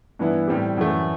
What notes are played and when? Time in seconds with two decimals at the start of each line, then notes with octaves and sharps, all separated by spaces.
0.19 G2 E3 B3 E4
0.47 A2 G3 C4 G4
0.77 F#2 E3 A3